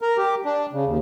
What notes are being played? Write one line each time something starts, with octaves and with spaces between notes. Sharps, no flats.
A#4
G4
D4
C#3
D#2